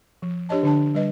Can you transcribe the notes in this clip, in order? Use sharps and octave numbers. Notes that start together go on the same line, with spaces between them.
F3
D4 G4 C#5 D#5 A5
D3 D4 A5
G3 B4 D#5